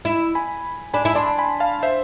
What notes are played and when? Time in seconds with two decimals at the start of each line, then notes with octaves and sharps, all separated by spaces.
0.05 E4
0.35 G#5 B5
0.94 D4 G#5 B5
1.05 E4
1.15 D4 A5 C6
1.38 G#5 B5
1.60 F5 A5
1.83 C5 E5